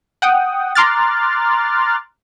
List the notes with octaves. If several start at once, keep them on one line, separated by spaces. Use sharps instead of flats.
F#5 G5 D#6
A#5 C6 D6 F6 F#6 A6